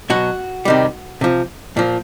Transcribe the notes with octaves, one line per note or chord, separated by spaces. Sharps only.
B2 F#3 F#4
C3 D#3 G3
C3 F3
A#2 F3